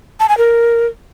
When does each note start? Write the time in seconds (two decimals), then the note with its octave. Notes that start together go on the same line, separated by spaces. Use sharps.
0.20 A5
0.29 G#5
0.38 A#4